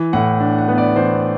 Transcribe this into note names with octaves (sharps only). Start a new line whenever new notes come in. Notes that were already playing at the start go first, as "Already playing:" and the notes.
Already playing: E3
A2 F#5
D4
F#5
B3
D5
E3 C5